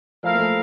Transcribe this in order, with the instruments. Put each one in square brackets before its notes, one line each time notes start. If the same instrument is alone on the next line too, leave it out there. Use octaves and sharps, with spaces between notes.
[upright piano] F3 A3 [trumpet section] E4 A#4 F5
[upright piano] A#3
F3 A3